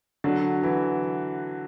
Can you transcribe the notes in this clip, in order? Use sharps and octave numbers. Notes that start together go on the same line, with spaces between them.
D3 F#3
E3